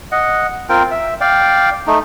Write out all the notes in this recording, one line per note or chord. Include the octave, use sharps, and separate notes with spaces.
D#5 F#5
C4 F4 A#4 G5
E5
D5 F5 G5
A3 D#4